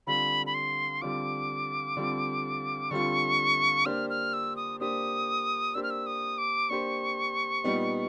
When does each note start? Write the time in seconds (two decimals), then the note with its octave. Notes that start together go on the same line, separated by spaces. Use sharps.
0.07 D3 G3 C4 F4 B5
0.47 B5
0.54 C6
1.02 D3 G3 C4 F4 D6
1.96 D3 G3 C4 F4
2.91 D3 G3 C4 F4 C#6
3.86 A#3 D4 G4 C5 F6
4.10 F6
4.33 E6
4.56 D#6
4.80 A#3 D4 G4 C5 D#6
5.74 A#3 D4 G4 C5 E6
5.83 F6
5.90 E6
6.06 D#6
6.38 D6
6.70 A#3 D4 G4 C5 C#6
7.64 A#2 G3 B3 D#4